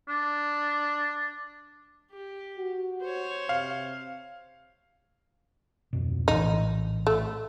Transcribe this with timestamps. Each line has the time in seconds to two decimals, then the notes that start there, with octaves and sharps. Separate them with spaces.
0.09 D4
2.11 G4
2.58 F#4
3.01 C5 C#5
3.49 C3 F5
5.93 D1 F2 B2
6.28 A#1 A2 E3 D#4
7.07 A3